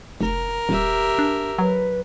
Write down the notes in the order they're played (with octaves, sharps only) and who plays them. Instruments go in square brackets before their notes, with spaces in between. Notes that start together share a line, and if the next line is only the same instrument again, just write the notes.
[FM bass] F1 [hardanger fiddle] A#4
[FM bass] D#1 [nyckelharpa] G4 E5
[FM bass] D4
[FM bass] F#3 [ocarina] B4